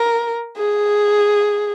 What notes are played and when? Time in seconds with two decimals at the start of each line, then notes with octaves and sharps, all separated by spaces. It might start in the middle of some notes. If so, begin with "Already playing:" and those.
Already playing: A#4
0.57 G#4